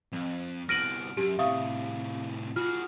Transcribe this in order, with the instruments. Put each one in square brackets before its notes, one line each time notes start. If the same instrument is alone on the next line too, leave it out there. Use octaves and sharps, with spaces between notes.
[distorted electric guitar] F2
[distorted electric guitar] C2 B3 [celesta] F6 D7 [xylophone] A#6 D#7 F#7
[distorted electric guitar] F#2 [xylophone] G4
[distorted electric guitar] A2 C3 [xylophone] E5 C#6 D#6 [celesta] F5
[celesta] F4 F6 [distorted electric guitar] F#4 G#4